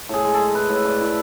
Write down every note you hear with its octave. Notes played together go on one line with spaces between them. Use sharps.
A2 G#4
G#3
A4
G#3
E4 B4
A2
A2 D5
E4 E5